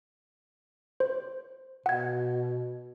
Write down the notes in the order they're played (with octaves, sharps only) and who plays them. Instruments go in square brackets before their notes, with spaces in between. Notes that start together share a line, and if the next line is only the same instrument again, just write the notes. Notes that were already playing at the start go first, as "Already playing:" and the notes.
[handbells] C5
[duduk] B2 [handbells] F#5 G#6